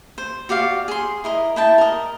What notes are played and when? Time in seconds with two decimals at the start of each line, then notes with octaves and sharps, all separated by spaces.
0.18 C5
0.49 F#4 G4 D5 F5
0.88 G#4 C6
1.24 E4 A#4 D#5
1.56 E4 G5 A5
1.78 A#4 D#5